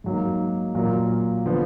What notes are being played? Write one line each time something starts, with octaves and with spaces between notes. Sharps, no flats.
G#2 F#3 A#3 D#4
A#2 F#3 A#3 F4 A#4
D3 F3 B3